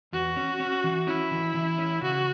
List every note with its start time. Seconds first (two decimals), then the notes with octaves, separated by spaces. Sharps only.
0.13 E2 F#4
0.37 C#4
0.60 C#4
0.84 E3
1.07 C#4 E4
1.32 E3
1.55 E3
1.78 C#4
2.02 C#3 F#4